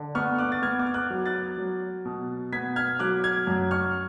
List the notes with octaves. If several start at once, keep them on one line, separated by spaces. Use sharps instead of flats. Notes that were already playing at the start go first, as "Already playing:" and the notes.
Already playing: D3
B3 C#6 F6
D6 F#6
A6
B3 F6 G#6
D6
F6
D6 F#6
F#3
F#6 A6
F#3
B2
B3 G#6 B6
F6 G#6
F#3 D6 F#6
F6 G#6
F#2
C#6 F6